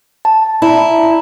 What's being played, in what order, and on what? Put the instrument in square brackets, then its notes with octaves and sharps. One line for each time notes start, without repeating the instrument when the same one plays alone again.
[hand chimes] A5
[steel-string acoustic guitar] E4 [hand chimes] D5 A#5